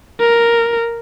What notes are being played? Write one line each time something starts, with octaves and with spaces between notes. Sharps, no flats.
A#4